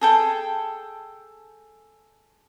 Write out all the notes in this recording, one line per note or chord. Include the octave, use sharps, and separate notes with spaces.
G#4 A4 G5